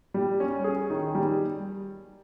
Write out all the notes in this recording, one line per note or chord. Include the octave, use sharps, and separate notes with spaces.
G3
C#4
G#4
D#3
G3